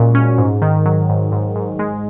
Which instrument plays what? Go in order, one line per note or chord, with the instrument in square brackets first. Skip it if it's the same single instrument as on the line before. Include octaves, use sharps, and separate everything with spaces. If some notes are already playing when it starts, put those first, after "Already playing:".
Already playing: [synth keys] A#2 G#3 C#4 F#4
C#4
G#2
D#3
F#3
G#2
G#2
G#2
G#3